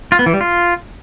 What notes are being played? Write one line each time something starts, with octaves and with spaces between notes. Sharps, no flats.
F4
B3
E3
G3
F4